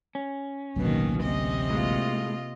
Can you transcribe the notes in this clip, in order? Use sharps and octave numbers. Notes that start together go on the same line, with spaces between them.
C#4
A1 D2 B2 D#3 F#3 A#3
C3 D#5
A2 G#3 A#3 F4